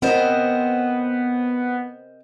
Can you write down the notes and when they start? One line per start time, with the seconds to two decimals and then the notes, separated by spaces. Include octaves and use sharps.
0.02 B3 C4 A#4 C5 D#5